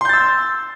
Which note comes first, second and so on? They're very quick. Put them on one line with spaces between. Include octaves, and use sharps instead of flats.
C6 G6 A6 E6